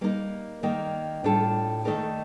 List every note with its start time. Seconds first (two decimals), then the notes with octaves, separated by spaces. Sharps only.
0.01 G3 A#3 D#4 A#4
0.63 D#3 G3 A#3
1.24 A2 G3 D4 F4 A4
1.85 D#3 A3 D#4 A#4 D5